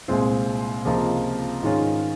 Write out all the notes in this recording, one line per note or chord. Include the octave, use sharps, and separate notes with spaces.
C2 A#2 G#3 C4 F4
C#2 C3 F3 A#3 F4
G#2 D#3 G#3 C#4 F4